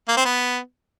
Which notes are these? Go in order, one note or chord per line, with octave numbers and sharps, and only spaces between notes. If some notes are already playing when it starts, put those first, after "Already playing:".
A#3
C4
B3